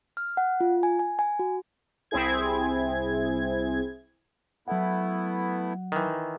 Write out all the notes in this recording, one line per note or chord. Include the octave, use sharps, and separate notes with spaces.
F6
F#5
F4
G#5
G#5
G#5
F#4
C2 C4 E4 G#4 G#6
F#3 A3 B3 E4 F#5
D#3 E3